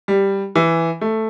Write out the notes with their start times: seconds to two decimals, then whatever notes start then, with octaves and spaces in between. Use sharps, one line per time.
0.08 G3
0.55 E3
1.01 A3